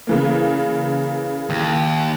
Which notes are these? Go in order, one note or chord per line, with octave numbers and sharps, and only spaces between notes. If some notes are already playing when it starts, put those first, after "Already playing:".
C#3 E3 A#3
D#2